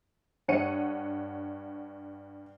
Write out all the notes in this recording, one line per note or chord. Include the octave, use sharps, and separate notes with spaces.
G2 C#5 F#5 C#7 D#7